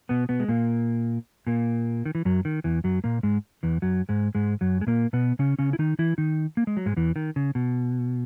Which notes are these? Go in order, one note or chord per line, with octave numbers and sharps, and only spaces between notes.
B2 B3
B2 B3
G#3
A#2 A#3
A#2 A#3
D#3
E3
F#2 F#3
D#3
E2 E3
F#2 F#3
A#2 A#3
G#2 G#3
E2 E3
F#2 F#3
G#2 G#3
G#2 G#3
F#2 F#3
G#3
A#2 A#3
B2 B3
C#3 C#4
C#3 C#4
E4
D#3 D#4
E3 E4
D#3 D#4
A#3
G#3
F#3
G#2 G#3
E2 E3
D#3
C#3
B2